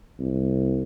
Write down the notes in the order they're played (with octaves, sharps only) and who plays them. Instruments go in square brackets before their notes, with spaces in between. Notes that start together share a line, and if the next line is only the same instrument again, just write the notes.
[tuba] C2